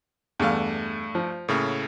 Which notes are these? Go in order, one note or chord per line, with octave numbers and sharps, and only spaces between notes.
E2 G2 A3 F5
F3
A2 C#3 A3 A#3